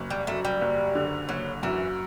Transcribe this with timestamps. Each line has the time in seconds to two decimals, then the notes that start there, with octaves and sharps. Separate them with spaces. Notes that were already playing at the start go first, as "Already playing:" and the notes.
Already playing: F#1
0.10 G3
0.27 F#2 A3
0.45 G3
0.61 F#1
0.95 D3
1.29 F#1 F#3
1.63 F#2 E3